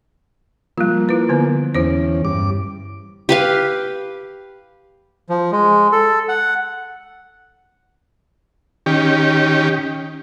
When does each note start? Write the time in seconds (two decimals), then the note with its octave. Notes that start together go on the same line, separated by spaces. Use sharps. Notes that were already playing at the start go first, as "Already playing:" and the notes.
0.78 F3 G3 A#3 F4
1.09 E4 B4
1.29 D3 B3 B4
1.75 E2 C#4 E4 C5
2.25 G2 D6
3.29 G4 B4 F5
5.29 F3
5.52 G#3
5.92 A4
6.29 F#5
8.86 D#3 C#4 G4